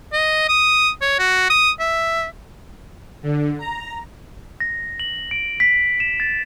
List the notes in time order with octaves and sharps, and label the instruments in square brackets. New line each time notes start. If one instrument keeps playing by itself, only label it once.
[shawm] D#5
D#6
C#5
F#4
D#6
E5
[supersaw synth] D3
A#5
[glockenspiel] A#6
F#7
D7
B6
E7
A6